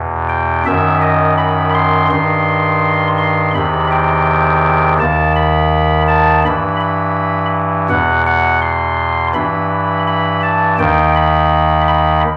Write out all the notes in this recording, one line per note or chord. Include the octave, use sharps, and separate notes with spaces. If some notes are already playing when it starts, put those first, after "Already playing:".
Already playing: E2 B2
G5
F#2 D#3 E5
D#5
B5
C6
G2 D#3 C6
C6
E2 C3 D#3 B5
G5
D#2 D#3 A5
B5
A5
G2 E3 B5
B5
E2 B2 F#5
F#5
C6
G2 E3 B5
B5
A5
D#2 D#3 G5
B5
B5